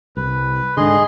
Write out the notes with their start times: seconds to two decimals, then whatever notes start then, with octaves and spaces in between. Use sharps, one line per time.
0.17 C2 B4
0.77 G#2 D3 G#4 D#5 C6